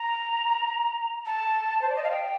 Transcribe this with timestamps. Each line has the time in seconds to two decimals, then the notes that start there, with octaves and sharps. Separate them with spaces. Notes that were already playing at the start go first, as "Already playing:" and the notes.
Already playing: A#5
1.26 A5
1.82 C5
1.89 D5
1.96 D#5
2.04 F5
2.11 G5